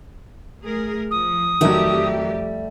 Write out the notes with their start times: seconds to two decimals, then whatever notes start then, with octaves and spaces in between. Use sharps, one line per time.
0.62 A3 G#4 A#4
1.11 F3 D#6
1.61 F2 D#3 F#3 G3 A3 G4 E5